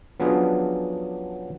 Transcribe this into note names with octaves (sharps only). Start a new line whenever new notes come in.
F3 F#3 B3 C#4 D4 G#4